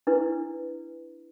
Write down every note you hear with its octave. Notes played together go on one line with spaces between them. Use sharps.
D4 E4 B4